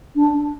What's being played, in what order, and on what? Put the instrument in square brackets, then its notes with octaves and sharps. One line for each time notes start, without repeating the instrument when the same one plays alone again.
[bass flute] D4